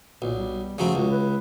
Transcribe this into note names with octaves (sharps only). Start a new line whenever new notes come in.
B1 A#2
G3
C#3 F3 F#3 A3
C#2 F#4
B4